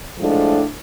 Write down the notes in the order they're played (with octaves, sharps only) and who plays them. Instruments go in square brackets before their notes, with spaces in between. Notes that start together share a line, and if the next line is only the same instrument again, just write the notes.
[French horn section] A2 F3 G#3 D4 A4